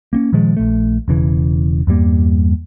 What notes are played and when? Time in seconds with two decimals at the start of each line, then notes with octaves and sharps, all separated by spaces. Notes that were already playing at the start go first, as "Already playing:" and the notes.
0.13 A#3 C4 C#4
0.32 A#2 D#3 F3 G#3
0.57 A#1 A3
1.08 E1 C#3 E3
1.87 E2 G2 G3 A#3